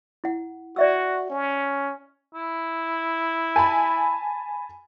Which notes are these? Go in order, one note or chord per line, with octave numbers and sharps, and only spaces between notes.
E4 F#5
F#4 D5 E5 E6
C#4
E4
G#5 A5 B5